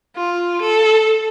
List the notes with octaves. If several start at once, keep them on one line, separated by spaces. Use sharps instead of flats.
F4
A4